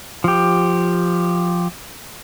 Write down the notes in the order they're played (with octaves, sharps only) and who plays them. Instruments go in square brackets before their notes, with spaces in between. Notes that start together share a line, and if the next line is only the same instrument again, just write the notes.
[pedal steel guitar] F3 G4